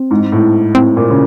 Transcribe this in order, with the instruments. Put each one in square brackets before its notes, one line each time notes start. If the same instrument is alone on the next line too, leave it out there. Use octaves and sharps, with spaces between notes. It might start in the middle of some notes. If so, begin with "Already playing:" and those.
Already playing: [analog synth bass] C4
[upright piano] G#2
A2
[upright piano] A2 [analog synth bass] C4
[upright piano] A#2
C#3